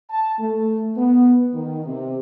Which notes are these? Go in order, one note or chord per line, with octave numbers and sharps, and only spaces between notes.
A5
A3
B3
D#3
C3